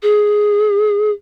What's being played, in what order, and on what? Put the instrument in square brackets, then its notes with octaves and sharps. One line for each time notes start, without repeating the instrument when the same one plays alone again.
[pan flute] G#4